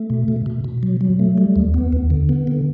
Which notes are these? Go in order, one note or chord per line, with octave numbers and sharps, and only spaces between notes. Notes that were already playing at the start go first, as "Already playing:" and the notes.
Already playing: A3
B2
B2
B2
B2
F#3
F#3
A3
G3
D#2
B3
D#2
D3
B3
D3